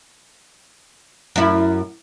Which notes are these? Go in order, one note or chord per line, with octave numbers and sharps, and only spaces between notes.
F#2 E4